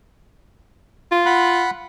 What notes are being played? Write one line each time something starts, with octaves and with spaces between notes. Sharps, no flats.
F4
F#5 B5 F#6